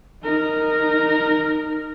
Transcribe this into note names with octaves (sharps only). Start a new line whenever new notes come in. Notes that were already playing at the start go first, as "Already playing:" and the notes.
D#4 A#4